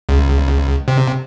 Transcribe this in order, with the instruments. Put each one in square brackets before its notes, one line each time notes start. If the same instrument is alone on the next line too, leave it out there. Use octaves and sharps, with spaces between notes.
[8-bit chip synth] C#2
C3